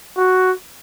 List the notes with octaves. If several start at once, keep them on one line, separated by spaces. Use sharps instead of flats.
F#4